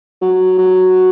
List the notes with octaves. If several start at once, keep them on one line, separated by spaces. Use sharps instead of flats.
F#3
F#3